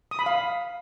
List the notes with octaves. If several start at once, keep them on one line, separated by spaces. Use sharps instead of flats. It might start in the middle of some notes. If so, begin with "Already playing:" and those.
D#6
B5
F5